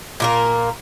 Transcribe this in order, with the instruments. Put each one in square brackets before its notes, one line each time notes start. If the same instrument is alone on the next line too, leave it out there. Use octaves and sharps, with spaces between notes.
[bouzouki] A#2 A#3 A#4